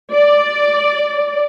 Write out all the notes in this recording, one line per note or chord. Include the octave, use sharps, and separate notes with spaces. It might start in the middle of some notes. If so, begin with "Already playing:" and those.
D5